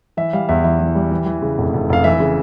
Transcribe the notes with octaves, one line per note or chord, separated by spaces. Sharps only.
E3 E5
G3 F5
E2 E5
E3 E5
E3
G3
E3
E3
C#3
F1
F1
F1 F5
E3 E5
C#3